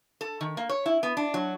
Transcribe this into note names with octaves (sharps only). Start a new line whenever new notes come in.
A4
D#3
A#3
C#5
E4
B3
D4
F#3